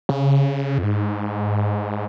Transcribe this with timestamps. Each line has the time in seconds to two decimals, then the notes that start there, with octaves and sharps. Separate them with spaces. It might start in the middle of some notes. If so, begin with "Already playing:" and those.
0.09 C#3
0.78 F2
0.83 G#2